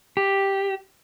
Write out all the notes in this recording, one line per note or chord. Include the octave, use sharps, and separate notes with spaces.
G4